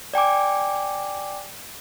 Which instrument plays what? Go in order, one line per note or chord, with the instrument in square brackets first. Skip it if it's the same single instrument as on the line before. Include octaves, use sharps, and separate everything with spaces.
[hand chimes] D5 G5 G#5 D6